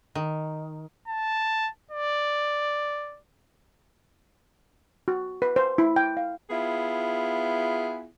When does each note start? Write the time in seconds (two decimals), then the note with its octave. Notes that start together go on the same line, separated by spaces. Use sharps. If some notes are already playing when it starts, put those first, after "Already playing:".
0.15 D#3
1.08 A5
1.91 D5
5.08 F#4
5.42 B4
5.56 C5
5.78 E4
5.96 G5
6.17 F5
6.50 B3 E4 F4 G#4